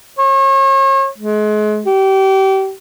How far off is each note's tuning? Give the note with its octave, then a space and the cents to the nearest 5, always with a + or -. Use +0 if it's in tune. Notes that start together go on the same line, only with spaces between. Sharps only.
C#5 -40
G#3 +35
G4 -30